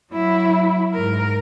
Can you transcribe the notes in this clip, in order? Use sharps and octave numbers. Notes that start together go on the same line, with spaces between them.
F#3 E4
G#2 A#4